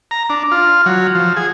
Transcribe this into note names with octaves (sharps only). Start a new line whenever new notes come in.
A#5
D4
F4
F#3
F3
G#4